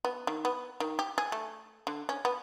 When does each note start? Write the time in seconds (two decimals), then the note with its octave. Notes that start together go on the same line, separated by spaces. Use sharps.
0.05 B3
0.27 D#3
0.45 B3
0.80 D#3
0.99 G4
1.18 G#4
1.32 A3
1.87 D3
2.09 C#4
2.25 B3